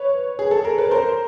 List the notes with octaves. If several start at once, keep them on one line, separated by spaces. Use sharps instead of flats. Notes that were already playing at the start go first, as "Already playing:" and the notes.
Already playing: B4 C#5
G#4
A4
A#4
B4
A#4 C5